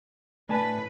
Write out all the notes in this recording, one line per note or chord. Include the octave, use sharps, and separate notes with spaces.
A2 A3 D4 B4 G#5 A5